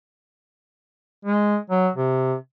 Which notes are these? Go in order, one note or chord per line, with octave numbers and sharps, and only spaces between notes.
G#3
F#3
C3